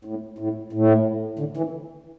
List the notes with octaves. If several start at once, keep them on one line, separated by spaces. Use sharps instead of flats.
A2
A2
A2
D3
E3